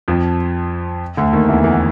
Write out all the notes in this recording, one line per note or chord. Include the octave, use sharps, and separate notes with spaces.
F2 F3
D2 D3
D#2 D#3
E2 E3
E2 E3